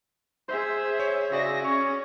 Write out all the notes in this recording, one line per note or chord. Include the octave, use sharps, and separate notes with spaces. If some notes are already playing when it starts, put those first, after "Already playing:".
G#4 C5 E5
C#5
C#3 F#4 G#4 D5 E5 A#6
C#4 C#5